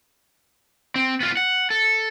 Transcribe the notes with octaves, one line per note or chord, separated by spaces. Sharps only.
C4
B3 F4
F#5
A4